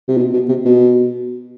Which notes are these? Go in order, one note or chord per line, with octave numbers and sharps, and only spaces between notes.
C3
B2
B2
C3
B2